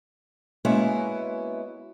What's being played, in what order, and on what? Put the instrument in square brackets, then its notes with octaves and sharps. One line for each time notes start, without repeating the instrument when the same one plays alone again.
[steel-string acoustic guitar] G#3 A#3 B3 C#4 E4 F#4